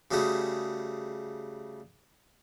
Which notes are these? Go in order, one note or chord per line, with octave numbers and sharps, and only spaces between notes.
C#3 G3 A3 F#4 G#4